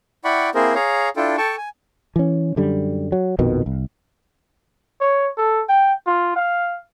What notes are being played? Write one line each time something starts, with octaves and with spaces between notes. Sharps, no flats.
E4 D5 F#5 G5 B5 C#6
A#3 C4 E4 G#4 A#4 C5
G#4 C#5 F5 A#5
D4 E4 F4 A4 G5
A4 G5 A5 C#6
G#5
E3 C#4
F#2 D3 G3
F#3
A#1 F2 B2 D#3
C2
C#5
A4
G5
F4
F5